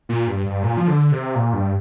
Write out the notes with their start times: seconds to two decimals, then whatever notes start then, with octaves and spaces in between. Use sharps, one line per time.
0.09 A#2
0.27 G2
0.46 G2
0.63 A#2
0.77 F3
0.88 D3
1.12 C3
1.35 A#2
1.53 G2